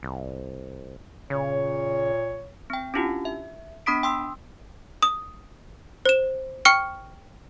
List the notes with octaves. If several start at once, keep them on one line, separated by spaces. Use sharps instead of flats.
C2
A#2 C#3 C#5
C4 G5
C#4 D4 E4 F4 G4
E5
B3 D4 B5 D#6 B6 D7
G5 C6 D#6 E6
D#6
C5 E7
G5 C#6 F6 C#7